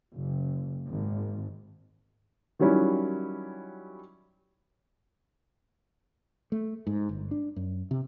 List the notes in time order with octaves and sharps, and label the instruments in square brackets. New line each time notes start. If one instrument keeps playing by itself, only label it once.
[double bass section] F#1
G#1
[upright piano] D#3 F#3 G3 C#4 E4
[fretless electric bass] A3
G#2
G1
D4
F#2
C3